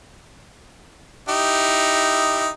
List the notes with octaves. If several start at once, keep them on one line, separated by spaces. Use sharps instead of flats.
D#4 E4 G4